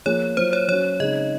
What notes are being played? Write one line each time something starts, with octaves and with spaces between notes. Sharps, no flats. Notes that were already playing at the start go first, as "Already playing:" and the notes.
F3 A#3 F4 G#4 C#5
F#3 A#3 F4 C5
C#5
F#3 C#4 F#4 C#5
C#3 G#3 C4 D#4 D#5